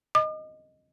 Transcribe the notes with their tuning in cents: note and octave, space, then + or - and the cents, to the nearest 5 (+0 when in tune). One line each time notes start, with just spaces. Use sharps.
D#5 +0 D6 +45